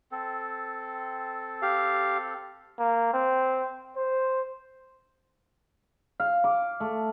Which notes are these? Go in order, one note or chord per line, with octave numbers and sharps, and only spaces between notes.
C4 A4
G4 F5
A#3
C4
C5
F5
D6
A3